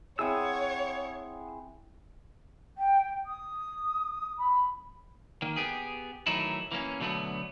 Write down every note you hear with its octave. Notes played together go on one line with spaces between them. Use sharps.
C4 E4 G#4 C#5 F#5 D#6 E6
G5
D#6
B5
D#3 A#3
B3 G4 G#4
D#3 E3 F#3 A3 D#4 E4
E3 A#3 C#4
B2 D3 F#3 A3 B3